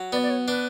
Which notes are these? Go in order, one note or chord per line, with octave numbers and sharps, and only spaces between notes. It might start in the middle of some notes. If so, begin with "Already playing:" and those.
Already playing: F#3
B3 D5
D5
C#5
D4 B4